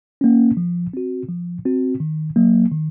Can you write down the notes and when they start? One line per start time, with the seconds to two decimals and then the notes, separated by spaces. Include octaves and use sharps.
0.21 A#3 C#4
0.57 F3
0.93 C4 F#4
1.29 F3
1.65 C4 F#4
2.00 D#3
2.36 F#3 A#3
2.72 D#3